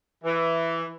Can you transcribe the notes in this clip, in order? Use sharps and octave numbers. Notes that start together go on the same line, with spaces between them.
E3